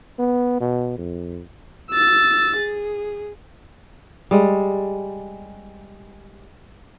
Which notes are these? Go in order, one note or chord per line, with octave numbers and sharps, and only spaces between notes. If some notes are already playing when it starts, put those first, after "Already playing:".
B3
B2
F2
E6 A6
G#4
G3 G#3